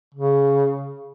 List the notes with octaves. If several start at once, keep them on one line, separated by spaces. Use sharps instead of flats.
C#3